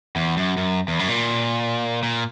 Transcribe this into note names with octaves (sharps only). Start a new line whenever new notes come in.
E2
F#2
F#2
E2
F#2
A#2
A#2